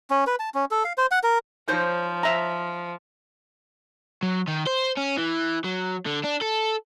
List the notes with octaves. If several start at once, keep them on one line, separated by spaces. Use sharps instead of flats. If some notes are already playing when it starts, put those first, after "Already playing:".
C#4
B4
A5
C#4
A4
F5
C5
F#5
A#4
F3 D#4 C5 C#5
E5 A#5
F#3
D#3
C5
C#4
E3
F#3
D3
D4
A4